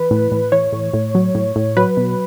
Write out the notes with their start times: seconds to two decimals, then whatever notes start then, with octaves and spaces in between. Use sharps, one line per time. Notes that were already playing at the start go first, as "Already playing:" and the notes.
Already playing: E3 B4
0.11 A2
0.32 A2
0.52 E3 C#5
0.72 A2
0.93 A2
1.15 F#3
1.35 A2
1.56 A2
1.77 F#3 B4
1.97 B2